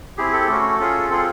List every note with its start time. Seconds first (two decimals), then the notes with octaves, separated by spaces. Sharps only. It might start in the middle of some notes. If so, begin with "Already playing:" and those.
0.17 C4 E4 G4 G#4
0.33 A4
0.48 A3 C#4 F#4
0.79 C#4 F4 G#4
1.10 C4 F4 G#4 A4